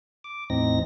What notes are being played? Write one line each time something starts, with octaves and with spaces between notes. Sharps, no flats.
D6
E2 A2 C4 D#4 A#6